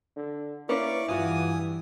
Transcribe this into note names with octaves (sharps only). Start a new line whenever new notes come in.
D3
A#3 C#4 E4 B4 D5 C#6 D6
G2 E3 F4 F#4 G#5 D#6